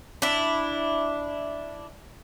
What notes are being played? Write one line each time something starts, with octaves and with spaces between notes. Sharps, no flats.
D4 E4